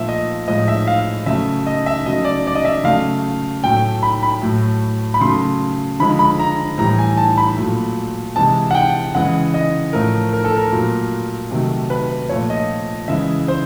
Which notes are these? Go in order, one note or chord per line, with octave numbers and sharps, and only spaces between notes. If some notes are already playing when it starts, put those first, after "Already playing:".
Already playing: A#2 F3 A3 E5
D#5
A2 F3 G#3 D#5
E5
F5
C#3 F#3 A3 E5
D#5
E5
C#3 F#3 A3 D#5
D5
D5
D#5
E5
C#3 F#3 A3 F5
A2 F#3 A3 G5
B5
B5
A2 F#3 A3
B5
C#3 F#3 A3 C6
D3 F3 G#3 B5
B5
A#5
A2 E3 G3 A#5
G#5
A5
B5
A#2 F#3 A3
C3 E3 G#3 A5
F#5
G5
C#3 E3 G#3 F#5
D#5
A2 F3 A3 A#4
A#4
A4
A#4
A#2 F#3 A3
C3 D#3 F#3 A3
B4
A#2 F3 A3 C#5
D#5
C#3 E3 G#3 E5
C5